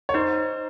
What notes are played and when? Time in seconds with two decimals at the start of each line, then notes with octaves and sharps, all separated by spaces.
0.09 C#5
0.14 D#4 C5